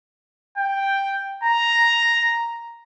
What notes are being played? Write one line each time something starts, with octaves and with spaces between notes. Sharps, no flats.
G5
A#5